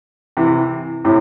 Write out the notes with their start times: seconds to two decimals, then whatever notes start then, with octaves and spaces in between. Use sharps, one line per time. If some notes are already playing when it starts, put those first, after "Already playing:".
0.37 C3 E3
1.05 A2 C3